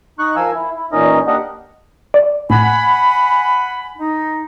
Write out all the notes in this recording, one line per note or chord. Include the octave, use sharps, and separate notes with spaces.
D#4 C#6 F#6
F3 A#4 F5 G#5 E6
E4
E4
E2 A#2 C#4 D#4 A#4 D#5
A#3 D4 G4 A#4 D#5 F#5
D5
A2 F#5 G#5 B5
D#4